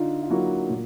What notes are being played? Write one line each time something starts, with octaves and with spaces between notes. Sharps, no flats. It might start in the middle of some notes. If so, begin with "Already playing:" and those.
Already playing: D3 D#4 F4
F4
F#3 A#3 E4 F#4
A#2